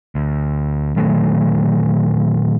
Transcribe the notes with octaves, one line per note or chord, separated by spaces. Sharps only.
D2
A#2 D#3 F#3 A3